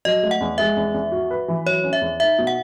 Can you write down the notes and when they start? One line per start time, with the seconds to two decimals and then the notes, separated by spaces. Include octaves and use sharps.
0.05 F#3 D#5
0.23 A3
0.31 F#5
0.41 E2
0.58 G#3 E5
0.77 E2
0.94 E2
1.12 F#4
1.31 B4
1.48 E3
1.66 F#3 C#5
1.84 C#4
1.93 E5
2.01 E2
2.20 D#4 E5
2.38 B2
2.47 F#5